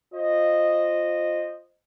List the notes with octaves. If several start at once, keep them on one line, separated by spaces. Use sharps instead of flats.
F4 C5 D#5